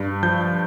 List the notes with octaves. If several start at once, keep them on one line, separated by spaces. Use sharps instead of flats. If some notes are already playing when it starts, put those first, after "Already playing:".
Already playing: G2
F3 G6